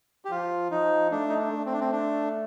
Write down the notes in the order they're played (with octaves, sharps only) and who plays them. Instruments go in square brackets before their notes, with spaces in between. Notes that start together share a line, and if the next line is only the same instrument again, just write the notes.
[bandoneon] G4
[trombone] F3 [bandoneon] F4
[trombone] F3 [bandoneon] D#4
[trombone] A3 [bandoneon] D4
[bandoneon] D#4
D4
[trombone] A3
[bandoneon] C4
D4
C4
D4